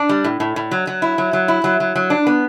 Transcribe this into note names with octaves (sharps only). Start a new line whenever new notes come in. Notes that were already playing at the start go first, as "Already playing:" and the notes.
Already playing: D4
G3
A2
A2
A2
F#3
F#3
E4
F#3
F#3
E4
F#3
F#3
F#3
D4
B3